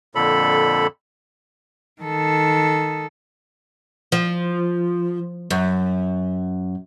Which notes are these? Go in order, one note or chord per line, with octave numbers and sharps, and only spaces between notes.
F2 A#2 D3 A4 B5
D#3 A4
F3
F#2